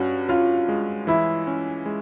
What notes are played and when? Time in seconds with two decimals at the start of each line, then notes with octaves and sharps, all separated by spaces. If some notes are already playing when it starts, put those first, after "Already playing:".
Already playing: G2 C#4 F#4
0.29 C#4 F4
0.69 G#3
1.07 E3 E4
1.47 C#4
1.86 G#3